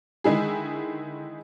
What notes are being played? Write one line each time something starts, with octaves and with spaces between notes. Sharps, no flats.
D3 D#3 G#3 E4 G#4